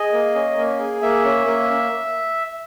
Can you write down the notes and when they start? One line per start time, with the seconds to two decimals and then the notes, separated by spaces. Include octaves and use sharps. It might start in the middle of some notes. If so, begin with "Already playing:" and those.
Already playing: G#4 D#5
0.13 A#3
0.35 C#4
0.57 A#3
0.79 G#4
1.02 A#3 E5
1.24 C#4
1.46 A#3